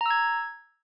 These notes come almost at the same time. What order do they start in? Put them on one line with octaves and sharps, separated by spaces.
A#5 E6 G#6